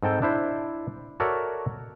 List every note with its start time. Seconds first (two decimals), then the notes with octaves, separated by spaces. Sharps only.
0.03 G#2 C4 A4 G5
0.22 D4 E4 C5
1.20 F#4 A4 A#4 C#5 D5 E5